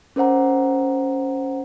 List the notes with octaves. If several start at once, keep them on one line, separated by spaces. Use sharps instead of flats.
C#4 A#4 C5 F#5 A#5